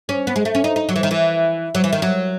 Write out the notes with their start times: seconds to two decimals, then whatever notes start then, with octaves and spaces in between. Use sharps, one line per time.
0.09 C#4
0.27 B3
0.36 G#3
0.45 A3
0.55 C#4
0.64 D#4
0.76 D#4
0.89 F#3
0.96 E3
1.03 D#3
1.11 E3
1.75 F#3
1.84 E3
1.93 D#3
2.02 F#3